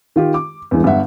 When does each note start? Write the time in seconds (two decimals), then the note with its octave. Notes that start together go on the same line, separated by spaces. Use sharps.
0.16 D#3 F4 G4
0.34 D6
0.71 E2 G2 E3 G#3
0.84 G1 G2 E5 F#5